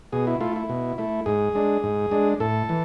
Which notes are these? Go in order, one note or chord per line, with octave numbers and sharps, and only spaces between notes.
B2 G#4
E4
A3 E4 F4
E4
B2
A3 E4
G#2 G#4
G#3 D4
G#2
G#3 D4
A2 A4
E3